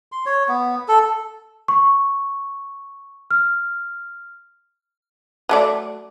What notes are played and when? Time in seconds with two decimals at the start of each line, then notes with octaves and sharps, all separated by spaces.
0.12 C6
0.26 C#5
0.48 B3
0.88 A4
1.68 C#6
3.31 F6
5.49 F#3 A3 D5